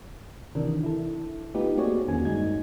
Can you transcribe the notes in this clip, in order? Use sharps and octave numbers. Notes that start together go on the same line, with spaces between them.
C3 D#3 E3 D4 A#4
E4 A4
A3 B3 D#4 F4 G4 B4
A#3 C4 F#4 G#4 C#5 D5
E2 D#3 A#3 C#4 F#4 G#5
G2 G#3 D#4 G#6